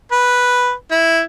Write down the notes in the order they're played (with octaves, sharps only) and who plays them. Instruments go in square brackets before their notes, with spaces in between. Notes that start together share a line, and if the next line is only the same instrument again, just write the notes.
[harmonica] B4
E4